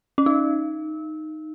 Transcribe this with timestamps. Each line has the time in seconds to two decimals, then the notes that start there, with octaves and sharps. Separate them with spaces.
0.18 C#4
0.26 D#4